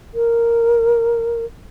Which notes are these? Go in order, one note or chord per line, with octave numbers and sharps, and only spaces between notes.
A#4